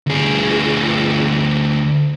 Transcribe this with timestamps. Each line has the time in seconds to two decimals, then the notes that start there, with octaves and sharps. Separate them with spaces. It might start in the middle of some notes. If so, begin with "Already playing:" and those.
0.07 D2 G#4